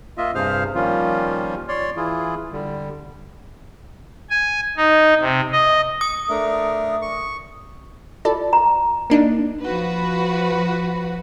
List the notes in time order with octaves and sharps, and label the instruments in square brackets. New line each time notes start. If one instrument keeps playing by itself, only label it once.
[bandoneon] A#3 F4 D#5 E5
G2 C3 G#4 C5 F5 F6
D#3 F3 G3 A#3 C#4 F4
C#5 D5 C6
E3 E4 F4 G#4
D3 G3
[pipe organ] G#5
D#4
C3
D#5
[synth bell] D#6
[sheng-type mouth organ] A3 D4 A#4
C#6
[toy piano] F4 [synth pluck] A4 D5 A5
[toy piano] A#5
[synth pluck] A#3 D4 D#4
[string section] F3 F#4 B4